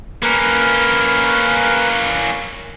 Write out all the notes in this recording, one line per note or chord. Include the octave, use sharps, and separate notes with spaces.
A#3 C#4 A#4 B4